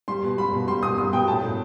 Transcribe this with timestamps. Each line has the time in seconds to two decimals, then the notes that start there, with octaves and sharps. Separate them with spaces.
0.08 G3 C6
0.24 B2
0.38 G3 B5
0.53 B2
0.68 G3 C6
0.82 B2 D#6
0.98 G3 D#6
1.12 B2 G5
1.28 A2 A5
1.42 A2